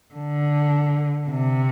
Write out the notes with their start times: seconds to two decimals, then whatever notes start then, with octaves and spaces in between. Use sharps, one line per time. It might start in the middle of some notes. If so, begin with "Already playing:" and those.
0.14 D3
1.29 C3